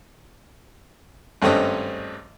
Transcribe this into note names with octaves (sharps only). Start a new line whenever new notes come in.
G#1 G2 A3 C4 C#4 D#5